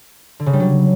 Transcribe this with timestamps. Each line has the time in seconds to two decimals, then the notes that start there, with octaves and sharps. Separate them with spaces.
0.40 D3
0.46 C#3
0.53 G3
0.60 F#3